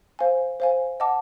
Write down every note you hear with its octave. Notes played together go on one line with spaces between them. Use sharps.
C5 F5 G#5
C5 F5 G#5
D#5 F#5 A5 D6